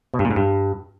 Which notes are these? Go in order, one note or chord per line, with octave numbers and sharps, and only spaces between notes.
B2
G2
A#2
G#2
G2